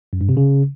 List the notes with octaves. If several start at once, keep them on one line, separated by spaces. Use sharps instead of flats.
F#2
G2
C3
C#3